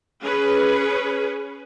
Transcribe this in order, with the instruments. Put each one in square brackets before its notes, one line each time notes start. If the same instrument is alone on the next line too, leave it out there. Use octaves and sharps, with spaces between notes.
[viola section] C#4 G#4 B4